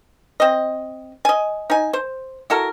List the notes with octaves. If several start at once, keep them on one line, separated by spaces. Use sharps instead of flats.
C4 D#5
D#5 G#5
D#4 G#5
C5
E4 F#4 A4 A#4